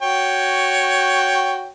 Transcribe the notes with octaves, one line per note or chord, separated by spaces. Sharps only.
F#4 C#5 G5